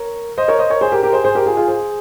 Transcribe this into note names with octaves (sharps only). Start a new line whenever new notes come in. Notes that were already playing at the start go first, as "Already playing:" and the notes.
Already playing: A#4 C#5
C5 D#5
A#4 C#5
C5 D#5
A#4 C#5
G#4 C5
G4 A#4
G4 A#4
G#4 C5
G#4 C5
G4 A#4
F4 G#4
F4 G#4
G#4 C5